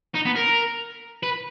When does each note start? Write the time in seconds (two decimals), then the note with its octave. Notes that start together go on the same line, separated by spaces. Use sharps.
0.15 D#4
0.26 B3
0.36 A#4
1.23 B4